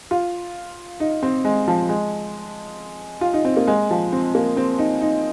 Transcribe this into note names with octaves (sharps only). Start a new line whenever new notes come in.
F4
D#4
C4
G#3
F3
G#3
F4
D#4
C4
A#3
G#3
F3
C4
A#3
C4
D#4
D#4